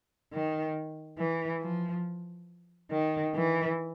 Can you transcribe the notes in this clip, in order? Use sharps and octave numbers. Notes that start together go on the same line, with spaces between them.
D#3
E3
F3
D#3
E3